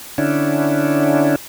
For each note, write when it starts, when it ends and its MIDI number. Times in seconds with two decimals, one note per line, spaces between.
0.18 1.36 50
0.18 1.36 61
0.18 1.36 62
0.18 1.36 64